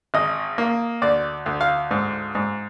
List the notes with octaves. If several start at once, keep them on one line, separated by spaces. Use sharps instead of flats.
G#1 D#5
A#3
D2 D5
D2
F5
G#2
G#2